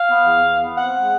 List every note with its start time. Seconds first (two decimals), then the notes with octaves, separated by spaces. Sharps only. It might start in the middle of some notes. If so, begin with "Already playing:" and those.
Already playing: F5
0.09 B3
0.26 E2
0.42 E2
0.60 B3
0.77 C4 F#5
0.94 G#3